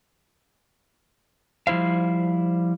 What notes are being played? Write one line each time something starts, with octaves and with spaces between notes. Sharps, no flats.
F3 G3 E4 C5 F5